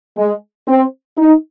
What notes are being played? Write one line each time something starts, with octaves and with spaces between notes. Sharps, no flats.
G#3
C4
D#4